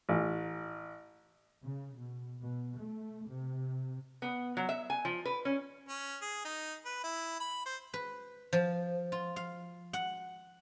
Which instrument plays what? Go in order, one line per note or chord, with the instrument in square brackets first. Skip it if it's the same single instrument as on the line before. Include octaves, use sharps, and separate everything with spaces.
[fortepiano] A1
[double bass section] C#3
B2
B2
A3
C3
[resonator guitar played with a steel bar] B3
F#3
E5
G#5
F3
B4
C#4
[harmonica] C#4
G#4
D#4
B4
E4
B5
C5
[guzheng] B4
F3
F4
F5
F#5